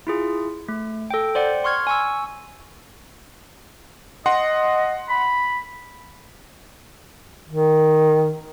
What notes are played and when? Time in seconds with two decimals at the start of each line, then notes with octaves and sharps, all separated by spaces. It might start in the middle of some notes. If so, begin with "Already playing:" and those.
0.07 E4 F4 G#4
0.68 A3
1.10 A4 G5
1.35 C5 D5 F#5 G5
1.64 C6 C#6 F6 G#6
1.87 G#5 C#6 E6
4.26 D#5 F#5 C6
5.09 B5
7.49 D#3